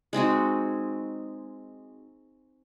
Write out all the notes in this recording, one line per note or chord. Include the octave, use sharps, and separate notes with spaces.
G#3 C4 D#4 F#4